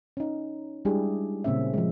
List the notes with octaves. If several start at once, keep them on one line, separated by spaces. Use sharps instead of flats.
C#4 D#4
G3 G#3 D4 E4 G4 G#4
A#2 C#3 A#3 C4 C#4 E5
F3 G#3